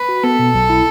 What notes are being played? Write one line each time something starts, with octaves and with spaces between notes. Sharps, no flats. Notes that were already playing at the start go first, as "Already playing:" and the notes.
Already playing: B4
F#4
B3 A4
B2
B1
E4